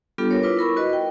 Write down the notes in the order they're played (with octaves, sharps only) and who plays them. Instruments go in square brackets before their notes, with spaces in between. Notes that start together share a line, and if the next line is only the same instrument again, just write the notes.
[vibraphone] G3 B3 D4 F4 G4 A4
A#4 C#5
E4 F4 B4 D6
E4 A#4 B5 C#6
F#4 B4 D#5
G5